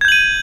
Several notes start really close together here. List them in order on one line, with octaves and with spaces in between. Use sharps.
G#6 G6 F#7 D#7